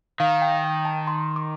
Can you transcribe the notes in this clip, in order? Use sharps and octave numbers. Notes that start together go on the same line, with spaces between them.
D#3 F5
G5
G5
A5
C6
D6